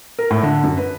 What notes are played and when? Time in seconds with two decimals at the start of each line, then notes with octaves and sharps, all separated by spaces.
0.19 A#4
0.30 A2
0.43 D3
0.64 F#2
0.77 B4